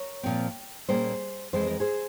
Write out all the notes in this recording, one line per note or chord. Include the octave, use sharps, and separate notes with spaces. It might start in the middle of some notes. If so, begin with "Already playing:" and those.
Already playing: A#4 C#5
A#2 F3 C4
A#2 G3 A#3 C#4 G#4 C5
F2 E3 G#3 C4 C5
A#4
G#4 C5